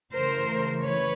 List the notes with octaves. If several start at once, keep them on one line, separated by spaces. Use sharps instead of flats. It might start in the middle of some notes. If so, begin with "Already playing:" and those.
C#3 E3 A3 A#4 C5
B4 C#5